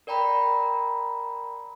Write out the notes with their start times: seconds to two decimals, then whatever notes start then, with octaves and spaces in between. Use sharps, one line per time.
0.07 A#4 D5 G5 A#5 B5